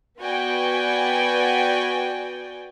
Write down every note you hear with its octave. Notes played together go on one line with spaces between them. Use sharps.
B3 F#4 B4 D5 G5 G#5